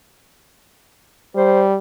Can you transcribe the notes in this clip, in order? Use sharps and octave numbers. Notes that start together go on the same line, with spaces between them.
G3 C5